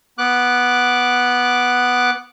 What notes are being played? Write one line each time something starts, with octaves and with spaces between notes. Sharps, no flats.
B3 D6 F#6